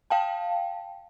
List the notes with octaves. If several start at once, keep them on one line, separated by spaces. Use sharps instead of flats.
F5 G5 A5